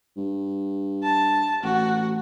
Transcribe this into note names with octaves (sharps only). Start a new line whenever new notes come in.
G2
A5
A1 F#4